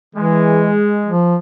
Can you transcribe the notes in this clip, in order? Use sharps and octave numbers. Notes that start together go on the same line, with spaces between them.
E3 G#3
F3